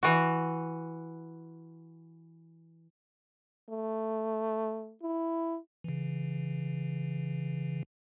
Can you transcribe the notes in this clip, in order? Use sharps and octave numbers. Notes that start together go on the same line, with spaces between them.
E3 F#4
A3
E4
C#3 E3